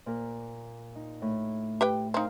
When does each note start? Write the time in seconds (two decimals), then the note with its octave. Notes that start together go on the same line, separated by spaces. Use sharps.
0.06 A#2 A#4
0.95 D#4
1.22 A2
1.81 G4 B4 G5
2.14 C4 D#4 A#4 F5 A#5